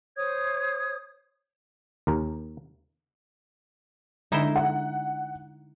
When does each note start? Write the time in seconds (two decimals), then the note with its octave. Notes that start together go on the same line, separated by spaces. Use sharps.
0.17 C5 C#5 D#6 G#6
2.07 D#2 A#4
4.32 D3 G#3 D#4 E4 C5
4.56 F#5